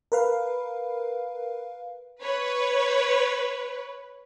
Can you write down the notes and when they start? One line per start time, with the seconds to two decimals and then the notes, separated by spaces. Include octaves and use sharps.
0.12 A#4 B4 F5
2.21 B4 C#5